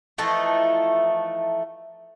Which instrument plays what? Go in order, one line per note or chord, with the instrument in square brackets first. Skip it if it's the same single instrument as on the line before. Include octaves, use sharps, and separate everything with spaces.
[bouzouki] E3 F3 A3 D#4